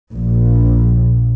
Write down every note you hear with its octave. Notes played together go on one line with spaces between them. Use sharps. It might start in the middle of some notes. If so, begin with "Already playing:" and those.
A#1